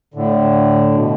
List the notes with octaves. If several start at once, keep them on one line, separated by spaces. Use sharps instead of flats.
A2 D3
B2